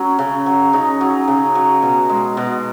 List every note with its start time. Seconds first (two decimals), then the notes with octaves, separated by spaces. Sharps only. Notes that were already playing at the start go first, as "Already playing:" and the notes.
Already playing: F#3 C#4
0.19 C#3
0.46 F#3
0.73 C#3 D#4
1.01 F#3
1.28 C#3
1.55 F#3
1.82 B2
2.09 G#3
2.37 B2